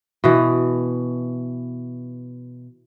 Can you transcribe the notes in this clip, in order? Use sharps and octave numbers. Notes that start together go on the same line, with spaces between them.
B2 E3